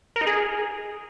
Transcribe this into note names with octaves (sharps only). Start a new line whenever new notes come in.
A#4
D#4
G#4